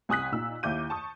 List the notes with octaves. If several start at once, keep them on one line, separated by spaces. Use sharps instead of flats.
C2 G#5 D#6 F#6 B6
A#2 D#4 E6
D#2 E4 D6 G6 D#7
A5 C#6 D#6